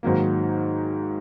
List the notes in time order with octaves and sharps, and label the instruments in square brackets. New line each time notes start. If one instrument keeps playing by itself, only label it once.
[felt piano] G#2 D#3 F#3 A#3